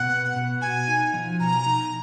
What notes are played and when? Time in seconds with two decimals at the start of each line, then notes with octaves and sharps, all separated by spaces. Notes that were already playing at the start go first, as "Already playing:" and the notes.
Already playing: B2 F#5
0.09 B3
0.36 B2
0.62 F#4 G#5
0.88 D#4
1.14 F3
1.40 B2 A#5
1.66 D#4